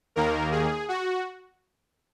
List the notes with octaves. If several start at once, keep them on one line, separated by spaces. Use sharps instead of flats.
D#2 D#3 A#3 A#4
G#4
F#4